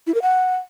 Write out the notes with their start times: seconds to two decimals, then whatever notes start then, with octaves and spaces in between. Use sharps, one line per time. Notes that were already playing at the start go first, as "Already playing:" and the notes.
0.07 E4
0.14 A#4
0.22 F#5